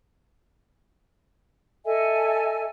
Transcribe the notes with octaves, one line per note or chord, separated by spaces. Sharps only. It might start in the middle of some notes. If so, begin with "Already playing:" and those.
A4 D#5 E5 G#5